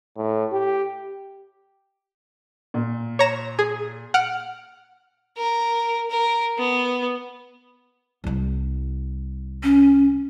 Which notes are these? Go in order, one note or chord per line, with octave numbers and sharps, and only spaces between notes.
A2
G4
A#2
C#5 A#5 E7
G#4
F#5 F6 D7
A#4
A#4
B3
C2 G3
C#4